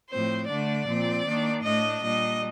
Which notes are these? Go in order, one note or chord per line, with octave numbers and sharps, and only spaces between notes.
A2 F3 C4 C5
D3 A3 D4 D5
A#2 F3 C4
D#3 A#3 D4
A2 A3 D4 D#5
A#2 G3 D4 D#5